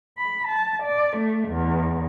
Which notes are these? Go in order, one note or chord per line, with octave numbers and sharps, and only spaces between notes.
B5
A5
D5
A3
E2